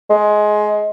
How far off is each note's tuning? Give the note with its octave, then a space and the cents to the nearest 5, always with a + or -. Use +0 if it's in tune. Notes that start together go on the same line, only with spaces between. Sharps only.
G#3 +20